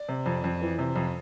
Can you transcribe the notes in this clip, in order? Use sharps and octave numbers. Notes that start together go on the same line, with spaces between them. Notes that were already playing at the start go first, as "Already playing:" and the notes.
Already playing: D5
C3
F2
F2
E3
C3
F2